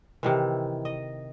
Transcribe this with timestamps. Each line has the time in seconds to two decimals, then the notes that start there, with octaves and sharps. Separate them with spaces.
0.23 C3 D#3 E3
0.85 D#5